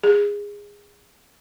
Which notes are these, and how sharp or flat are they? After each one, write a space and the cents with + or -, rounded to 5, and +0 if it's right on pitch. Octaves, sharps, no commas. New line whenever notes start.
G#4 -20